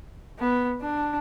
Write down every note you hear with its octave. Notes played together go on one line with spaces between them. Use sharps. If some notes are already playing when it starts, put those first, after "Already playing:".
B3
D4